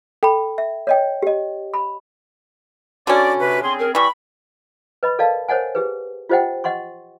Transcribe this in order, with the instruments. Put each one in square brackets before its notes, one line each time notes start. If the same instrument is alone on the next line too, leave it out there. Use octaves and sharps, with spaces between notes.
[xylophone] A4 B5 [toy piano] G5
[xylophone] E5
[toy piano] C#5 D#5 G5
G4 D#5
B5
[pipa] D3 C#4 [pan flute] F#4 [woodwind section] D5
[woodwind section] C3 B4
[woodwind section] C4 G#4 [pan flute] C6
[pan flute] A#4
[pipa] E3 G3 [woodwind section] B5 [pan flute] C#6
[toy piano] B4 D#5 B5
A4 A#4 D5 D#5 F5 A5
A#4 C5 C#5 D#5 F#5 G#5
G4 G#4 B4
F4 G4 C5 D#5 F#5 G5
D#5 F#5 C6 C#6